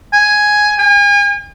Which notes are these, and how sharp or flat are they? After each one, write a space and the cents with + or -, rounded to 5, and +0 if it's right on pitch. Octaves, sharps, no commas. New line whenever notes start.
G#5 +5
G#5 -40